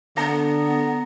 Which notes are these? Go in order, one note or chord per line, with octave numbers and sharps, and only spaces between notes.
D3 B3 A#5